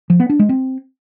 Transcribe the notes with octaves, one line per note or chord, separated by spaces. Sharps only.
F3
B3
D4
G#3
C4